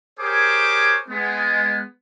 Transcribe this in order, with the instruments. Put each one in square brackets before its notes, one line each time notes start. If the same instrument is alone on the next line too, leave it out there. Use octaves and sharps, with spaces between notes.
[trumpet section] G4 G#4 A#4 C5 C#5 D6
G#3 B3